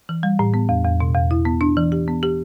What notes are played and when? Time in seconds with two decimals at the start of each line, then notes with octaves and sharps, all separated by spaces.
0.09 E3
0.23 G3
0.39 A2
0.54 B3
0.69 E2
0.85 E2
1.00 B2
1.15 E2
1.31 E4
1.45 B3
1.61 D4
1.77 E3
1.92 G4
2.08 B3
2.23 G4